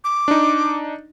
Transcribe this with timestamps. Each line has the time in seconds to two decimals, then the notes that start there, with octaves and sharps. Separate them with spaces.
0.04 D6
0.28 D4 D#4